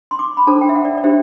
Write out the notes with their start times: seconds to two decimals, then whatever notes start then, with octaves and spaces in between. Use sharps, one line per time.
0.11 C6
0.19 D6
0.37 B5
0.47 D4 A4 C5 A5
0.61 G5
0.69 E5
0.76 F#5
0.85 D5
0.97 D5
1.04 D4 G4 C5 E5